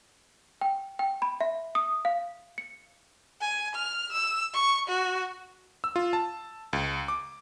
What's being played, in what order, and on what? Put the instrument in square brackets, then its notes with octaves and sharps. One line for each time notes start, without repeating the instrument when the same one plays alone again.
[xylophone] G5
G5
B5
E5
D#6
F5
C#7
[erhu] G#5
F6
E6
C#6
F#4
[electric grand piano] E6
F4
A5
C#2
D6